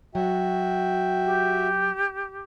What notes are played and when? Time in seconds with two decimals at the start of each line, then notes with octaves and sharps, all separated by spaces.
0.15 F#3 F#4 E5 G5
1.25 G4